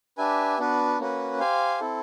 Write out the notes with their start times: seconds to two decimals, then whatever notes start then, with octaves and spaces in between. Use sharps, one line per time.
0.18 D4 G4 B4 E5 G#5
0.59 B3 D4 F#4 B4
0.99 A#3 C#4 F#4 B4
1.40 G4 C5 F5 G#5
1.80 C4 E4 A4